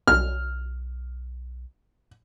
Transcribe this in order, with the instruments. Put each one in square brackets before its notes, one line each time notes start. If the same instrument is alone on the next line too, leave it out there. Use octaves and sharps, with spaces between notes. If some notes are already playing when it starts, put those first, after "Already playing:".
[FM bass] B1 [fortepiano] F6